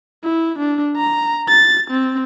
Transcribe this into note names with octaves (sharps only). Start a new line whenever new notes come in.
E4
D4
A#5
A6
C4